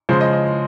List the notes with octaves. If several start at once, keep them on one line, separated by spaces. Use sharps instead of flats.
C#3 F3 G#3 C5
D#5
D#5